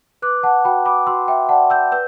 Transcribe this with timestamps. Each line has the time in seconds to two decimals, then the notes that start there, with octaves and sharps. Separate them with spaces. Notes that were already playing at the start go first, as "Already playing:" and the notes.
0.22 B4 D6 F#6
0.43 F#5 A5
0.64 F#4 G5 B5
0.86 B5 D6
1.07 F#4 C6 E6
1.28 E5 G5
1.49 D5 F#5 A5
1.70 E6 G6
1.92 B4 E6 G6